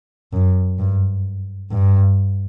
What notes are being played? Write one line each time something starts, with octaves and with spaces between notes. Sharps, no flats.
F#2
G2
G2